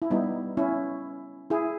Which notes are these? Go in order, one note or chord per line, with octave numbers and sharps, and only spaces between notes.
E4
G3 B3 D#4
C#4 E4
E4 G#4